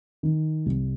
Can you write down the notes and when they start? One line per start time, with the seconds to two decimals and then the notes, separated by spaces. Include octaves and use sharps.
0.23 D#3
0.66 C2